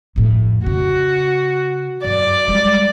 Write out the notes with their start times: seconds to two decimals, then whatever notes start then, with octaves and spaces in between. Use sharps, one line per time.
0.16 F2 A2
0.66 C#3 F#4
2.04 F#2 D5
2.48 G3 G#3